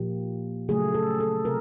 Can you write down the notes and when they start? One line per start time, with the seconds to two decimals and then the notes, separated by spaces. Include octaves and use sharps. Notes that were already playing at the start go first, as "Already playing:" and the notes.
Already playing: A#2 F3 A#3 G4
0.69 C#3 F#3 A3 G#4
0.94 A4
1.20 A4
1.45 C3 A#4